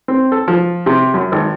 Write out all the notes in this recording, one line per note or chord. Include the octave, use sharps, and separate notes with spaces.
C4
A4
F3
C3
F#2
G#1